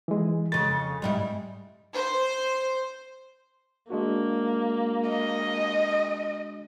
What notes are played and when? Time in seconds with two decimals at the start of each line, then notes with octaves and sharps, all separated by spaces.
0.08 E3 G#3
0.52 F2 C#3 A6
1.02 G#2 G3 E4
1.94 C5
3.90 G#3 A#3 D4 F#4
5.10 D#5